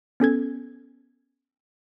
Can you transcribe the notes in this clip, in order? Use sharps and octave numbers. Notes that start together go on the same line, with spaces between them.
B3 C#4 A4 G#6